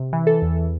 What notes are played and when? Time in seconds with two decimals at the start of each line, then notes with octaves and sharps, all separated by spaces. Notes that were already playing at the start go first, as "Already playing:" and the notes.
Already playing: C3
0.13 E3
0.27 A4
0.42 E2